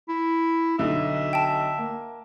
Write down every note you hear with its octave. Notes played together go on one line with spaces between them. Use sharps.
E4
B1 D3 D#4 E5
G5 A5
A#3